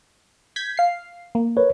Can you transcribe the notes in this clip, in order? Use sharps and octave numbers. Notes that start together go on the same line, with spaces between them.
G6 G#6 B6
F5 C7
A#3
A#4 B4 C#5